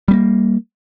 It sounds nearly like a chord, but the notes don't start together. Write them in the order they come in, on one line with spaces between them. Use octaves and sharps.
G3 B3 A#3